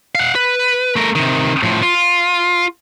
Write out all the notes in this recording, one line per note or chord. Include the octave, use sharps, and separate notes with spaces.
F5 F#5
B4
A3 A#4
C3 D#3
A2 F3
F4